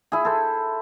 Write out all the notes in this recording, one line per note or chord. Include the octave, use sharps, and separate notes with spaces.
E4 G#4
A4 C5